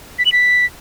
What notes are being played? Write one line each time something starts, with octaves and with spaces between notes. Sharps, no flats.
B6
F#7
B6